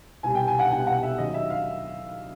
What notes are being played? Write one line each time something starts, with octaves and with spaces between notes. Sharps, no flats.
C2 B2 G3 G#5
G5
G#5
F#5
C2 B2 G3 G5
F#5
E5
D#2 C#3 F#3 D#5
E5
F5